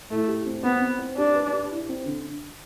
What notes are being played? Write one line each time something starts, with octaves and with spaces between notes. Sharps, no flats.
A2 A3
G4
C4
B3 C4
C4
C5
D4 G4
B4
G4
E4
C4
D3